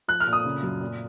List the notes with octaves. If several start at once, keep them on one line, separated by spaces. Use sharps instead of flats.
F3 F#6
F6
A#2
D#6
C#3
F#2
A#2